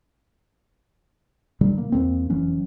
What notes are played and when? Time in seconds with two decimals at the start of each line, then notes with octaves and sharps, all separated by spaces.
1.61 B2 D3 F#3 G3
1.78 A#3
1.92 E2 A#2 A#3 C4
2.30 F1 E3 F#3 C#4